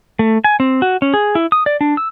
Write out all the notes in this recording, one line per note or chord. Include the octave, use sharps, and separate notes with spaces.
A3
G#5
C4
F#4
C#4
G#4
E4
D#6
D5
D4
E6